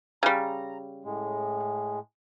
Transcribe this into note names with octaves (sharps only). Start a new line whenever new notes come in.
C#3 G3 A#5
A2 G#3